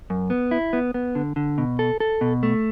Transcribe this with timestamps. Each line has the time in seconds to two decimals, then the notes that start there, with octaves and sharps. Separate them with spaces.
0.10 F#2
0.30 B3
0.51 E4
0.73 B3
0.94 B3
1.15 D3
1.36 D3
1.58 B2
1.79 A4
2.00 A4
2.21 B2
2.43 A3